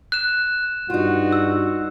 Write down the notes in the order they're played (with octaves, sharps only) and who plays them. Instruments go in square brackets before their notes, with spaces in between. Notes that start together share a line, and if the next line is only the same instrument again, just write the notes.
[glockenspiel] F#6 E7
[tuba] G2 [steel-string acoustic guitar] D#4 F4 [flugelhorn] F#4
[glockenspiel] E6